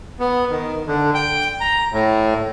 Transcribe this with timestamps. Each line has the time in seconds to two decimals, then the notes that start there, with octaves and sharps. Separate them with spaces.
0.20 B3
0.50 D#3
0.87 D3
1.14 G5
1.60 A#5
1.92 A2